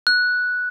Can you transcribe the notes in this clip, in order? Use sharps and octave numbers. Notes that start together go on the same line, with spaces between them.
F#6